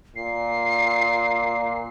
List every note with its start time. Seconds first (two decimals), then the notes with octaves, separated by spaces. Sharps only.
0.16 A#2 C7